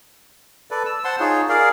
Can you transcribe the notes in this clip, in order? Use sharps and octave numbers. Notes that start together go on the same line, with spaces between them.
A4 B4 D5
E6
C5 F#5 A5 C6
D#4 F4 G#4 C#5
G#4 A#4 D5 F5